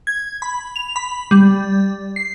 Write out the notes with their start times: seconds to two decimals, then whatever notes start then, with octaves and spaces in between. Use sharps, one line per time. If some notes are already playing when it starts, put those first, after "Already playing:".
0.07 G#6
0.42 B5
0.76 F7
0.96 B5
1.31 G3
2.16 C7